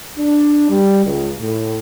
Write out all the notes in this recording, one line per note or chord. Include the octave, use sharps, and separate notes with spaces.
D4
G3
C#2
A2